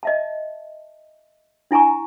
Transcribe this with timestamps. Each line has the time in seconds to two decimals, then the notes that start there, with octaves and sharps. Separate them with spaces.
0.03 D#5 E5 A5
1.71 D4 E4 G#5 A#5 C#6